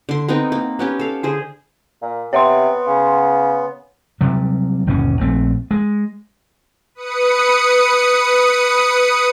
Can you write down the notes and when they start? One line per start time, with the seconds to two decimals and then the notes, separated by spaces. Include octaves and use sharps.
0.09 D3 C6
0.28 B3 C4 D#4 A#4
0.52 A#3
0.79 B3 C#4 G4
0.99 A4 F5
1.23 D3 G#4 C5
2.02 A#2
2.33 C3 B3 C#5 F#5 C6
2.87 C#3
4.21 C3 F#3 G3
4.87 G1 D#2 B2 C#4
5.21 A#1 A3 C4
5.71 G#3
6.95 B4 D#6 C#7